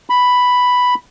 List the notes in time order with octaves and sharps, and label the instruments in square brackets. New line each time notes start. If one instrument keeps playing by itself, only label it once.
[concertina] B5